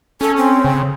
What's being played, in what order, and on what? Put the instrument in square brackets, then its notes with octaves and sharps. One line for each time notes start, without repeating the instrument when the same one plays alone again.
[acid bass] C#4 [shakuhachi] A4
[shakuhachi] C4
[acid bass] C#3